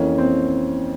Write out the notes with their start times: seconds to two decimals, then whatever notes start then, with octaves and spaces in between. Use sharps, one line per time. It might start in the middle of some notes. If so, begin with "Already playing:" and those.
Already playing: F2 E3 A#3 C#4
0.18 C4